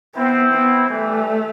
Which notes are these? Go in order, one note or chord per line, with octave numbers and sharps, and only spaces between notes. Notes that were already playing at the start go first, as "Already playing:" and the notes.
B3 C4 E4
B3
E3 G3 A3